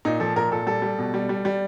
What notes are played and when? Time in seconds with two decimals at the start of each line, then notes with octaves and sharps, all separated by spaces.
0.05 A#2 D#4
0.20 F3 A4
0.36 A#2 A#4
0.52 A#2 A4
0.67 G3 A4
0.82 G3
0.98 B2
1.14 G3
1.29 G3
1.45 G3